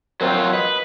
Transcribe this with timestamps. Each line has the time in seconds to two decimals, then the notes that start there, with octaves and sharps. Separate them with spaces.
0.21 F#3 C4 F4 A#4 C5 G5
0.53 B4 D#5